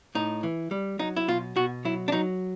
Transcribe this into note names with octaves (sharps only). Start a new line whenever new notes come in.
A2 D#4
E3
G3
F#3 D#4
E4
B2 F4
B2 F#4
F#3 E4
D4
F#3 D#4